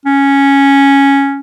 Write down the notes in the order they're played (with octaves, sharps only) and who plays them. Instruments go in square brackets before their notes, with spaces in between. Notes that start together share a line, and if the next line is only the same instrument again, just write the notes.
[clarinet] C#4